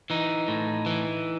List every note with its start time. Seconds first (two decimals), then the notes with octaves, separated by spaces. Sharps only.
0.10 E3 D#4
0.48 A2
0.86 E3